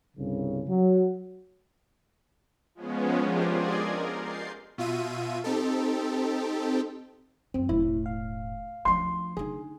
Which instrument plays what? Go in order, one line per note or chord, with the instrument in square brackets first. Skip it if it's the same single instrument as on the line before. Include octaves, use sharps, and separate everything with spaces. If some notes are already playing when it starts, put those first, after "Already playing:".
[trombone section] C2 G2 C#3
F#3
[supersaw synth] F3 G#3 B3 C#4
D4 F4 G4 G#4 A#4 C5
G#4 D5 D#5 C6 G#6
A#4
G6 A6 C7
B2 F4 E5 D#7
C4 D#4 G4 A4
[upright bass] F#2 A2 [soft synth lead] C4
[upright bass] E1 A2 [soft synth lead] E4
[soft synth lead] F5
[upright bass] D2 F3 [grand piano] C6
[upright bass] D3 D#4 [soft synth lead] G#4